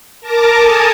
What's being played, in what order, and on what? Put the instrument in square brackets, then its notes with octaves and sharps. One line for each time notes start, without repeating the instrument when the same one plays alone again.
[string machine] A#4 A5 A#5 D6
A4 G#5 A5 D#6